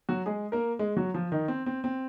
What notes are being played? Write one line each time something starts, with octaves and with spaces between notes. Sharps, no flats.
F#3 F#4
G#3 G#4
A#3 A#4
G#3 G#4
F#3 F#4
F3 F4
D#3 D#4
C4
C4
C4